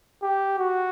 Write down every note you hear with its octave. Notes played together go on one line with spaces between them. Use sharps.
G4
F#4